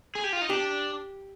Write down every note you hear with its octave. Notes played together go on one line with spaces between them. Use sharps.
G#4
G4
F4
D#4
D4 G4